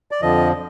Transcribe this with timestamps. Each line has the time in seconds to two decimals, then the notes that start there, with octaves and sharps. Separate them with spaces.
0.11 D5
0.21 F2 D3 F3 D#5